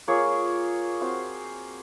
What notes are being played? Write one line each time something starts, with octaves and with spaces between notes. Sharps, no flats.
A#3 F4 G#4 C#5
C4 F#4 C5 F5